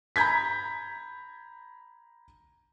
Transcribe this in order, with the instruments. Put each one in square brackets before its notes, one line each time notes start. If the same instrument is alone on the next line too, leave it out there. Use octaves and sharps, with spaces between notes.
[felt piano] A#5 B5 G6 G#6 B6